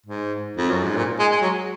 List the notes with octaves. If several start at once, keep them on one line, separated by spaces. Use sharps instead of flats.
G#2
F2
F#2
G#2
A#2
G#3
G#3
F#3